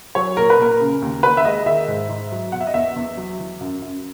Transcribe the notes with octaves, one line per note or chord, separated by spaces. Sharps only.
F#3 C#5
A#2 A#4
B4
A#2 A#4
C#3
D#2
D#2 B4
E5
G#3 D#5
D#3 E5
G#2
G#2
F#3
B2 F#5
E5
D#5
E2 E5
E2
F#3
E3
F#2
F#2